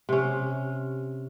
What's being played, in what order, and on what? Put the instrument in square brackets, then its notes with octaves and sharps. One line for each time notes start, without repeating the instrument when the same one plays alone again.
[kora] C3 C#4